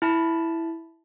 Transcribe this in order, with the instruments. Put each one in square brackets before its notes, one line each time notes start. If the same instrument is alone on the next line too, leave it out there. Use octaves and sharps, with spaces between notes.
[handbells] E4 A5 B5